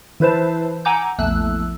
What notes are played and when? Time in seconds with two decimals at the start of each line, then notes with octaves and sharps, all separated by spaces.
0.20 E3 E4 B4 C5 A5
0.85 F#5 G#5 A#5 D6 E6 G6
1.19 A#1 E2 A3 E6 F#6